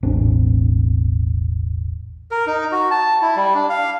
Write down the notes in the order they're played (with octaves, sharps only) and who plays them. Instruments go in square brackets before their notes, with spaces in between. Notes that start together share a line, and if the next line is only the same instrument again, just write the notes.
[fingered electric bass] E1 A1 C4 D4
[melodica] A#4
D#4
F#4
A5
E4
G3
D4
F5